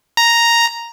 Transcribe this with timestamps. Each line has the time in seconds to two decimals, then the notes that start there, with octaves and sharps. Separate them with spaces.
0.17 A#5